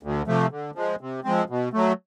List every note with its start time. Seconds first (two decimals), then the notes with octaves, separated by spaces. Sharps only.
0.03 D2
0.27 C3 F3 A3
0.51 D3
0.75 F3 G#3
1.01 C3
1.24 F3 G#3 C4
1.49 B2
1.73 F#3 A3